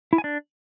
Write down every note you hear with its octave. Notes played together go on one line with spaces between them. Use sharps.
E4
G#5
D4